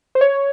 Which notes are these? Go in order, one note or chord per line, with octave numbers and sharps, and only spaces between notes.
C5
C#5